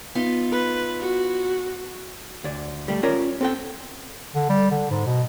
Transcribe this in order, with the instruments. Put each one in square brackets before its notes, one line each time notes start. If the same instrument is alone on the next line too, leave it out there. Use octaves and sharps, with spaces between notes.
[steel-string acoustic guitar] B3 D#4 F4
[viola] B4
F#4
[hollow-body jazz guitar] D2 D5
G3 A3
C#4 F4 A#4 D5
C4 A4 G5
[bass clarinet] D3
G3
D3
G#2
B2